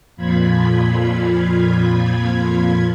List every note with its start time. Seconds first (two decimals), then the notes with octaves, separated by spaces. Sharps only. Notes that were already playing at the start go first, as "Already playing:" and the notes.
0.16 F2 A#2 F3 F4 B5 G#6